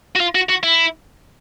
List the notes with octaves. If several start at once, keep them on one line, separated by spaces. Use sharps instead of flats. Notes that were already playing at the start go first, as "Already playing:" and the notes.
F#4
F4
F#4
F#4
E4